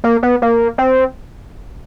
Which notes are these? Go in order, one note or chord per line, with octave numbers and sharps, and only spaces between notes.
A#3
B3
A#3
C4